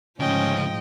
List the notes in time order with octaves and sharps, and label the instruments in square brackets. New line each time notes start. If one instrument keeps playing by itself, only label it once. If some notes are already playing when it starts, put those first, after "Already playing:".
[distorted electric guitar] D2 C#3 [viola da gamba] G#2 F3 [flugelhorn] C#4 [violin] D#5 G5